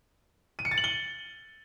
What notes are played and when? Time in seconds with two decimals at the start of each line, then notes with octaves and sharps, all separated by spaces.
0.59 D#7
0.65 C#7
0.71 A6
0.78 F#7
0.84 G7